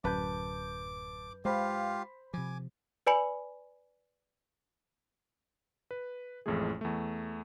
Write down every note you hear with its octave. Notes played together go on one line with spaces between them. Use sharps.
D1 F#2 B4 A5 D6 G6
G#3 F4 G4 C5 F5 B5
C3 F3 G#5 D6
B4 D5 G#5 B5 C#7 F#7
B4
A1 F2 A2 G#3 A3 G#4
E2 A3